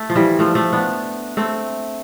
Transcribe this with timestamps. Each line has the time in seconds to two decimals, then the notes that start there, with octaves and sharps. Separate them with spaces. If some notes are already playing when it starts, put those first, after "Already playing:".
Already playing: A3
0.10 F3
0.15 E3 G3
0.39 F3 A3
0.55 F3 A3
0.73 B3 D4
1.37 A3 C4